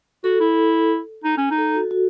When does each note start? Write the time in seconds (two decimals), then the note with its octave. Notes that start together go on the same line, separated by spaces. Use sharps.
0.24 F#4 A4
0.40 E4
1.24 D#4
1.37 C#4
1.51 D#4
1.58 A4
1.75 F#4
1.91 F#4